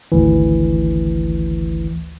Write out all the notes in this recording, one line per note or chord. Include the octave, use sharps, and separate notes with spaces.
G#1 D2 E3